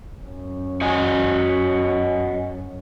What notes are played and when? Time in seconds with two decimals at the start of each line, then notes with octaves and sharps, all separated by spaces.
0.21 F#2 C#4
0.81 F#4 D#5 G#5